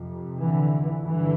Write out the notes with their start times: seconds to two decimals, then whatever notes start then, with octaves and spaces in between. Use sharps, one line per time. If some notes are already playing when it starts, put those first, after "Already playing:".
Already playing: F2 C3
0.39 D3 E3
1.04 G2 D3 E3